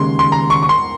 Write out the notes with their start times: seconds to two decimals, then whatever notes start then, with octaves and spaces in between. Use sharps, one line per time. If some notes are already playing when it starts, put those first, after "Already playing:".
Already playing: D#2 C#3 G#3 C6
0.19 C6
0.32 A#5
0.50 C#6
0.62 C#6
0.69 C6